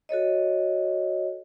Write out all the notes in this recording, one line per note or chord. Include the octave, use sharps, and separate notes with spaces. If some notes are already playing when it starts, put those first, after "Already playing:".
F#4 A4 C#5 D#5